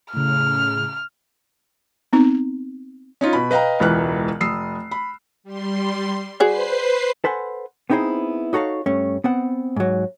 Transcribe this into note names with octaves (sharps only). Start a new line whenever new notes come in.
A2 C#3 F6
B3 C4 D#4
C#4 D#4 F4
B2 B5
B4 D#5 F5 G5 A#5
E1 C#2 E3 B4 F6 F#6
F1 D#6 E6 C7
B5
G3 C6
F#4 G#4 B4 C5 D5 C7
A4 B4 C5 F#5 G#5
B3 C4 D#4 E4 G#4 C5
D#4 F#4 A4 C#5 F5
G2 A3 C#4
B3 C4 F#5
G#2 F#3